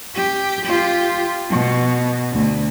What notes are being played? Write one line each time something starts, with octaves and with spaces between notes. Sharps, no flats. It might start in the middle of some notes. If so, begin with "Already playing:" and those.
G4
F4 G4
B2
D2